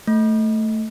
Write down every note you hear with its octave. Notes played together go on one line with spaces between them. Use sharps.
A3